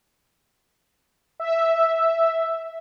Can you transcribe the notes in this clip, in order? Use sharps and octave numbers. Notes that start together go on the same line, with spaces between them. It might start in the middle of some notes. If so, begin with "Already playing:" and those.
E5